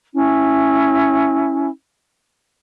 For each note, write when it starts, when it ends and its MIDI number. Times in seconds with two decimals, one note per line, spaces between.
0.13 1.67 61
0.13 1.67 64